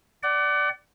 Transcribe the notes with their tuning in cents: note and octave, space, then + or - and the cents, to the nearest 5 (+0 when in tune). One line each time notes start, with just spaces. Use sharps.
D5 +0 F#5 +35